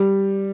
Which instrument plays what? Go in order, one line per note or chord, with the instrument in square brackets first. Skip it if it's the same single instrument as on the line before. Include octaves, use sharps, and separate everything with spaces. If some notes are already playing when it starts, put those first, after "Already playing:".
Already playing: [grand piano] G3